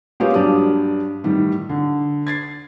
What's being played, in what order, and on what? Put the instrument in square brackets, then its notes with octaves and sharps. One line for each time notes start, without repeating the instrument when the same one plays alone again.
[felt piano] G#3 A#3 B3 C#4 F4 G4
G2 F#3 D4 G4 D5 D#6
A2 D#3 E3 G3
D3
G#6 A6 C7